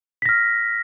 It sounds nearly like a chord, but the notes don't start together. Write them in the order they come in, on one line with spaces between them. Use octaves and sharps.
B6 A#6 F6